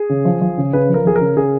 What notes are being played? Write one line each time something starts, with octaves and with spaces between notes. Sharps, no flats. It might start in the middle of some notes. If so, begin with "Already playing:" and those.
Already playing: G#4
C#3
F3
F3
C#3
C#3 B4
F3
A#4
F3 G#4
A#4
C#3
C#3 G#4